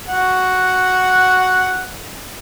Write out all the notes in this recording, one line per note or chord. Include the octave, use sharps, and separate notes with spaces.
F#4 F#5